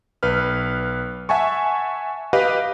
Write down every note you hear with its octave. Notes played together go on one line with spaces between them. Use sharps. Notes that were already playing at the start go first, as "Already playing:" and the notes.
B1 B4 F6
E5 F#5 G#5 A5 C#6
G4 B4 D#5 F5